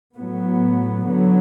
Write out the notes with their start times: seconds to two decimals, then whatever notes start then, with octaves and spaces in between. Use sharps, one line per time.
0.16 A2 F#3 B3
1.05 D3 F#3 B3